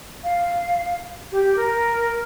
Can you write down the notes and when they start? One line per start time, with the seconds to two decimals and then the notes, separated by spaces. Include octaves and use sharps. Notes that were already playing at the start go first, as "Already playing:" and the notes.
0.24 F5
1.32 G4
1.57 A#4